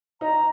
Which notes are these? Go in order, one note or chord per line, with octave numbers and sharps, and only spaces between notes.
D#4 A#5